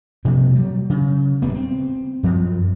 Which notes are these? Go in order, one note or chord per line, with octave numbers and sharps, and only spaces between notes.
B2 F3 G3 A#3
F#3 G3
C#3
D1 G2 G3 B3
C4
F#2 F3